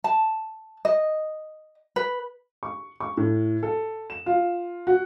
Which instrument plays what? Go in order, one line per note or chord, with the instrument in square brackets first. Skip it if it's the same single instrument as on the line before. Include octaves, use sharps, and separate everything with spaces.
[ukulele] A5
D#5
B4
[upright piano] C#6
C#6
A2
A4
E7
F4
F#4